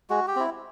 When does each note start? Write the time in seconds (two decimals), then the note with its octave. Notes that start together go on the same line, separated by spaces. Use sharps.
0.10 G#3 F#4
0.28 G4
0.36 C4 E4